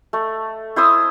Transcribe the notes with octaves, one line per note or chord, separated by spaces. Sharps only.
A3
E4 C5 D#6 E6